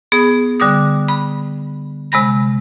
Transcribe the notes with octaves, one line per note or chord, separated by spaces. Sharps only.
B3 G#4 D#6
D3 G3 D6 D#6
B5
C3 G#3 B5 A#6